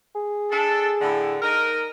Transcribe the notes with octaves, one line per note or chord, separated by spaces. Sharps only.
G#4
D4 A4
A2 D3 E4
D#4 A#4